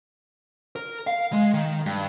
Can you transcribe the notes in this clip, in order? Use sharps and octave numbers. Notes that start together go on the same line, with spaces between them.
A#4
F5
G#3
D#3
G2